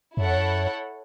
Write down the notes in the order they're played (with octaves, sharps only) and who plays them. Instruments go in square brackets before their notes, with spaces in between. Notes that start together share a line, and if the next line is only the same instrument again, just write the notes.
[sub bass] F#2 [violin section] E4 A4 C#5 F#5
[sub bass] F2
F#2